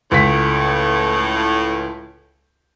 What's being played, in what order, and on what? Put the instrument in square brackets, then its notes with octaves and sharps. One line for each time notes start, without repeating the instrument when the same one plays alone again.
[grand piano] C#2 B6 [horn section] A2